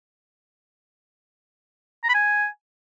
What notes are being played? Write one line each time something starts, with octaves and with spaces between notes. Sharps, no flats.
A#5
B5
G#5